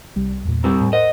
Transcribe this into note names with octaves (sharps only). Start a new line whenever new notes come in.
C2 G3
E2 A#2
C3 G3 E6
A2
A#4 C5 D#5 F#5